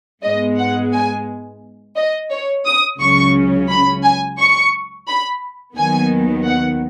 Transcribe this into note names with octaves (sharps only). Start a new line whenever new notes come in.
G#2 G#3 B3 D#5
F#5
G#5
D#5
C#5
D#6
C#2 C#3 F#3 C#4 C#6
B5
G#5
C#6
B5
D#2 D#3 F#3 B3 G#5
F#5